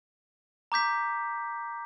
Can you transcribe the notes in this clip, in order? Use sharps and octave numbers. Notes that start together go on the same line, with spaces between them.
A#5 D6 G6 B6